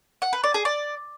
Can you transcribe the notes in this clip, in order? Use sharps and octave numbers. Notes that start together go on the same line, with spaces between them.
F#5
B4
D5
G#4
D5